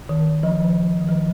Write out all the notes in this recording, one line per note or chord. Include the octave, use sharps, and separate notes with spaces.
D#3
F3
D#3
F3